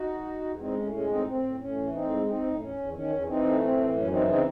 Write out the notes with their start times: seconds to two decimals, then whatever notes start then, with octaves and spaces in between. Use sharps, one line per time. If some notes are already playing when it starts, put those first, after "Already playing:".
Already playing: D#4 F#4
0.08 E2
0.25 E2
0.41 E2
0.59 G#3 C4 D#4
0.75 A2 C#4
0.92 G#3 C#4
1.08 A2 C4 D#4
1.26 A2 C4
1.43 A2
1.59 A2 C#4
1.76 E3
1.93 A2 C4 D#4
2.09 G#3
2.26 C4 D#4
2.43 A2
2.60 E2 C#4
2.76 E2
2.93 D#3 C#4
3.10 E2
3.26 E3 C4 D#4
3.44 A3
3.60 A2 C4
3.77 E3
3.94 F#2 C#4
4.10 E3 C4 D#4
4.27 C#3 C4 D#4